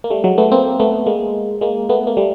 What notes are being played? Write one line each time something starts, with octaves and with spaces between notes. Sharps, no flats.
A#3
G3 A3
F#3 G#3
A3 B3
A#3 C4
A3 B3
G#3 A#3
G#3 A#3
A3 B3
A#3
G3 A3